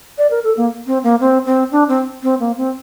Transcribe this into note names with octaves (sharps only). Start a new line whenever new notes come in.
D5
A#4
A4
A#3
C4
A#3
C4
C4
D4
C4
C4
A#3
C4